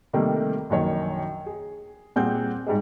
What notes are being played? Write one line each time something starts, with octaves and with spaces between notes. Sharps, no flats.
C3 D#3 G3 A3 A#3
A#1 F#2 D#3 C#5
G#4
A#2 G3 C4 G#4 F#5 G6
G#2 G3 G#3